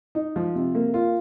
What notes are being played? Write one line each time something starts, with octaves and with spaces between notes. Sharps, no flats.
D#4
F3
C3
A#3
F4